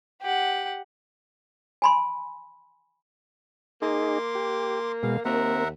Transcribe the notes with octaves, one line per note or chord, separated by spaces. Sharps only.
G4 F#5
G#5 B5 C6
A#3 D#4 G#4 C6 D6
G4
B2 G#3 F5
D#2 A#3 C4 A#4 E5 F#5